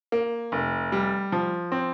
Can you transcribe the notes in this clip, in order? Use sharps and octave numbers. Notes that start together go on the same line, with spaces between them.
A#3
F1
G3
F3
C4